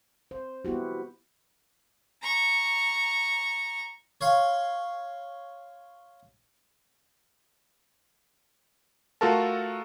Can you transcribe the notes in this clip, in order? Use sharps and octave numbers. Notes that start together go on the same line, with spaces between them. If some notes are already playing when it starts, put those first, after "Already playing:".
C5
B3 E4 F#4 G4
A#5 C#6
C#5 F5 C6
A3 F4 F#4 A4 A#4 A5